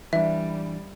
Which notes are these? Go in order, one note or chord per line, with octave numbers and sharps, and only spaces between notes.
E3 G3 D4 E5